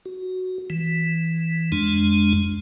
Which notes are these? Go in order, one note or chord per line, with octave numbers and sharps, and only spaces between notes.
F#4
E3
F2 G#3 D4